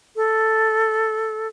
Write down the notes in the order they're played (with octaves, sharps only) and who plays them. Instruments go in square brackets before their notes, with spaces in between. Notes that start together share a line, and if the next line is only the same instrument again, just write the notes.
[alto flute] A4